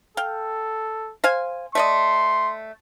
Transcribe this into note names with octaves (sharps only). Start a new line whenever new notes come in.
A4 F5 G5
C5 F5 G#5
A3 D5 D#5 C6